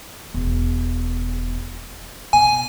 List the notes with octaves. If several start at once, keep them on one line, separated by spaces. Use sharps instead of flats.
E1
B2 G#5